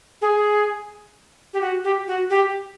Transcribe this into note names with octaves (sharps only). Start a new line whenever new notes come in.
G#4
G4
F#4
G4
F#4
G4